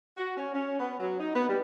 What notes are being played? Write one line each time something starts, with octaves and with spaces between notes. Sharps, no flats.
F#4
C#4
C#4
B3
F#3
D#4
B3
G3